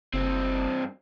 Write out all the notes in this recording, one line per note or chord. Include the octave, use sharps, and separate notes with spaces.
F#1 G2 C4